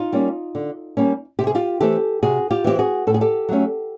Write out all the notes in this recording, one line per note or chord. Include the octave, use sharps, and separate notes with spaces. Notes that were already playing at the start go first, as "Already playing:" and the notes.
Already playing: D#4 F4
G3 A#3 C#4
D3
G3 A#3 C#4
C3 G4
G#4
F4 G4
E3 A3 C4 G4 A4
C3 F#4 G#4
F4 G4
E3 A3 C4 G4
F#4 G#4
A2 A4
G#4
G4 A4
F#3 A3 C#4